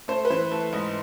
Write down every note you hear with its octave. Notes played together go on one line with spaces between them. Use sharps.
A3 C5
B4
E3 C5
A3
G#2 D#5